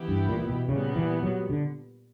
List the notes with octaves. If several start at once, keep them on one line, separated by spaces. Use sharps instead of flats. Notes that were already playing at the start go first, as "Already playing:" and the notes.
Already playing: E3 B3 E4 G4
G2
A#2
A#2
B2
A#2 C#3 G3 B3
E3
F#3
D3